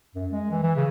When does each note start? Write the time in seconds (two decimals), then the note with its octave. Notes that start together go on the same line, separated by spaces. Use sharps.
0.15 F#2
0.31 G#3
0.51 E3
0.63 E3
0.76 C#3